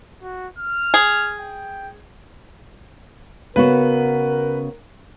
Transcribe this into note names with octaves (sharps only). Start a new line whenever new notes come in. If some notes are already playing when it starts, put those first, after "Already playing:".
F#4
F6
G#4
G5
C#3 B3 F#4 A#4 B4